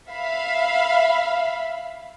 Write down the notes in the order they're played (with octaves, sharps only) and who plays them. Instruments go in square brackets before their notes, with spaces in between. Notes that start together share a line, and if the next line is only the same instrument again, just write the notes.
[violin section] E5 F5 B5